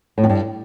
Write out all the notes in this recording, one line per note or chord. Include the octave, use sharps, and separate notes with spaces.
A2
F2
G2